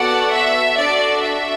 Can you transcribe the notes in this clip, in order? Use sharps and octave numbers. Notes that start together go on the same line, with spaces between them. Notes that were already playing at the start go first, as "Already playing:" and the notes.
Already playing: B3 F#4 A4 D5 F#5
E5
D4 F#4 A4 D5
E5